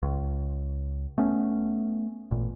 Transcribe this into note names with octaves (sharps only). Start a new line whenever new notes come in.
C#2
A3 B3 C#4
A1 A#2